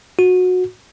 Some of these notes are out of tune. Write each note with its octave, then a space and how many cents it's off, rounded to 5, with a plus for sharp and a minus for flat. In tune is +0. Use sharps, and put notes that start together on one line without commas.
F#4 -20